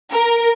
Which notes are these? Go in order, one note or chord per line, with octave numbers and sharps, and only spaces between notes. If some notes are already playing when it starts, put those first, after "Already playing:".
A#4